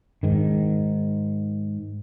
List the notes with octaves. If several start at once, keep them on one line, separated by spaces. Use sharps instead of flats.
G#2 D#3